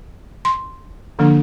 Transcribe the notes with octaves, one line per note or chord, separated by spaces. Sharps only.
C6
D3 F3 A#3 D4